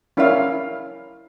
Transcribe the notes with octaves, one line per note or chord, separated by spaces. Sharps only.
C#4 E4 A#4 D5 E5 F5